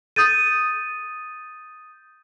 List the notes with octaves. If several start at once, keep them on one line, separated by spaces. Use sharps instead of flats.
D#6 G6 A6 D#7